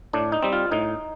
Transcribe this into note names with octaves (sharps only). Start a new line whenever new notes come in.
A2 D4
D#4
G3 C4
F4
A2 D#4